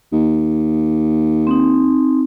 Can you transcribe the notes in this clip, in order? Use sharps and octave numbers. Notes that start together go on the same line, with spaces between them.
D#2
C4 D#4